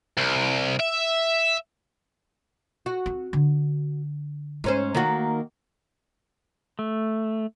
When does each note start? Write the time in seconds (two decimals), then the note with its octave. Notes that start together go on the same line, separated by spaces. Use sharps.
0.17 C2
0.80 E5
2.86 F#4
3.06 C4
3.33 D3
4.64 G#2 A3 C#4 C5
4.95 D#3 A#3 F#4
6.79 A3